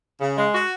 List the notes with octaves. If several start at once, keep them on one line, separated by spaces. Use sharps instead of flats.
C#3
G#3
F#4